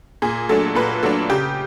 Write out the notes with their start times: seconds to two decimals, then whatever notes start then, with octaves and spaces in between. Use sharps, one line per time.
0.22 A#2 G#4
0.49 F#3 A3 D4 A4
0.75 A#2 B4
1.03 F#3 A3 D4 A4
1.30 C#3 G4